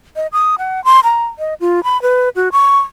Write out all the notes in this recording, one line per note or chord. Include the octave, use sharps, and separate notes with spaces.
D#5
D#6
F#5
C6
A#5
D#5
F4
B5
B4
F#4
C#6